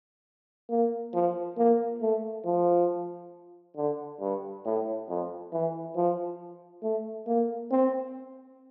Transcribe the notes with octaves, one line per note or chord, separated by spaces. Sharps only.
A#3
F3
A#3
A3
F3
D3
G2
A2
F2
E3
F3
A3
A#3
C4